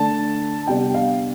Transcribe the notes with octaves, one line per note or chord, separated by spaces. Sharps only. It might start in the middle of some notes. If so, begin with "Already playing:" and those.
Already playing: D3 A3 D4 A5
C3 G3 B3 D4 G5
F5